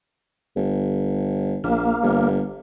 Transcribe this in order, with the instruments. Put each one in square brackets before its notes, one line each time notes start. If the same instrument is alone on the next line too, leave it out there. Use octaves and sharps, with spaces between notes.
[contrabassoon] G1
[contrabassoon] A#1 [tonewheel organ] A#3
[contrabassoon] G1